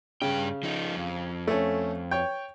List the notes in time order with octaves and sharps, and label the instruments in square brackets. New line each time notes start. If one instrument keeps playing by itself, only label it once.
[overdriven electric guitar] G2 G5 [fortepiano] C#3
[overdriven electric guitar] F3 D#4
F2
[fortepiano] A3 C#4
C#5 G5